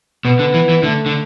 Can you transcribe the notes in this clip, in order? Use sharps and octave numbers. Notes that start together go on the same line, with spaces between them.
B2 B3
D3
E3
E3
D3 A3
D3